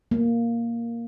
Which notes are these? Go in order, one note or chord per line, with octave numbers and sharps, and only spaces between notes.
A#3